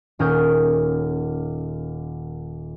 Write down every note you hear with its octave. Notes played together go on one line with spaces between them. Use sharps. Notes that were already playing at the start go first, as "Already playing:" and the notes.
D#1 C#4 A#4 G5 D#6 G6